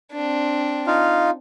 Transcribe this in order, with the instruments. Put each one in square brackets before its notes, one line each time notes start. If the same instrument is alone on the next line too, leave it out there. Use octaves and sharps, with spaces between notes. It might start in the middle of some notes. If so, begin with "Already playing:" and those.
[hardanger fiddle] C4 D4
[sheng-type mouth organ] D#4 F4 F5